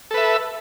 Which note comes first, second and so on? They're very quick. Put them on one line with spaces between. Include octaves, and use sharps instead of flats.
A4 B4 E5